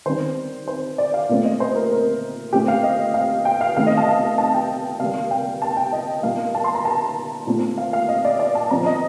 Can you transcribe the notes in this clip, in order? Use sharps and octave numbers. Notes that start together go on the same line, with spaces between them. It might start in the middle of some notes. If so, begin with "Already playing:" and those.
D#3 G3 C4 C5
C5
D5
F5
A#2 A3 C4
D#5
C5
A#4
A#4
A#2 A3 C4 G4
F5
D#5
F5
G5
F5
C3 D#3 A3 C4 F5
D#5
A5
F5
A5
G5
C3 G3 A#3 F5
G5
A5
G5
D#5
A#2 G3 A#3 F5
A5
C6
A#5
A5
A#2 A3 C4
F5
F5
D#5
D5
D5
A5
A#2 F3 C4 A#5
D#5